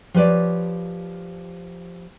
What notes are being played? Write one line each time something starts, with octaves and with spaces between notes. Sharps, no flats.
F3 G4 B4 C#5 D5